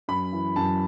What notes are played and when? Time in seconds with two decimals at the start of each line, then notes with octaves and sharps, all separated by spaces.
0.08 F#2 B5
0.33 E3
0.56 F#2 A5